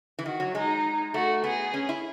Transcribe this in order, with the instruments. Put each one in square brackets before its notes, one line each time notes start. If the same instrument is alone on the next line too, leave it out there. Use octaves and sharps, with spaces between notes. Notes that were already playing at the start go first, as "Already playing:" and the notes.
[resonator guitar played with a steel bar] E3
[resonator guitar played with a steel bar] D#3 [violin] F#4
[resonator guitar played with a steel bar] F#3
[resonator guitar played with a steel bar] G#3 [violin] D#4
[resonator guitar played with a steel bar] A3 [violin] F#4
[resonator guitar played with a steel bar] B3 [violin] G#4
[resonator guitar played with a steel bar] C#4
E4